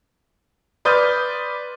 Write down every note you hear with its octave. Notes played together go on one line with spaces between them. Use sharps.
B4 D5 C6 D#6 F6 G6